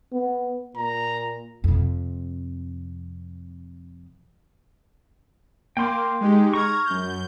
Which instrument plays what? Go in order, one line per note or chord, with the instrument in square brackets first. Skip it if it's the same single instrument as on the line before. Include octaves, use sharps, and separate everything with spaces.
[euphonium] B3
[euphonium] A#2 [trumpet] A#5
[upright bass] F2 C3
[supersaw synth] A#3 [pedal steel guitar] G5 C6 D6
[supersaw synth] G#3 D#4 G4
[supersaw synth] A#5 G#6 [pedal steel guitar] C#6 F6
[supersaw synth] F#2 G6